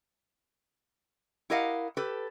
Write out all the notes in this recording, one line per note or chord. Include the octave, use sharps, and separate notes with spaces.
E4 G4 A#4 D#5 F5 F#5
G4 A4 B4